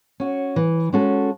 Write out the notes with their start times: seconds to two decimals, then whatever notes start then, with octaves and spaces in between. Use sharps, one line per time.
0.20 C#4 F#4
0.56 E3
0.92 G#3 C#4 F#4 A4